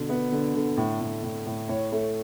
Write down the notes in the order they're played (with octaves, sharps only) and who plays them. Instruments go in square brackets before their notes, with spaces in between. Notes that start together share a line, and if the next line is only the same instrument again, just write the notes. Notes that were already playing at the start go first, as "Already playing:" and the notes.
Already playing: [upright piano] B2 D3
B3
D3
D3
A2
A2
A2
A2
A2 C#5
A3